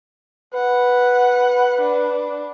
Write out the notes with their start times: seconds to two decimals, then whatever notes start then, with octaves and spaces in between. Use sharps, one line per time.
0.54 B4 F#5
1.81 D4